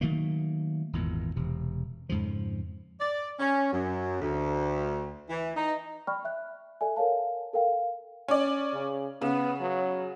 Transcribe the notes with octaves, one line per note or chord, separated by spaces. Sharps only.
D#3 F#3 A3 A#3
G#1 E2 A#2
E1 C3
F2 G#2 C#3 F3
D5
C#4
F#2
D2
E3
D#4
D5 G5 B5 C#6 F6
E5 F#6
A4 D5 E5 G#5
A4 A#4 C#5 F5 A5
A4 A#4 F5 G5
C#4 D5
C#3
C#3 B3
F#3